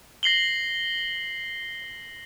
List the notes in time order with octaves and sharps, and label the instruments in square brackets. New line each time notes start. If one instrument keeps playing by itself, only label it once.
[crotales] A#6 C7 F#7 G7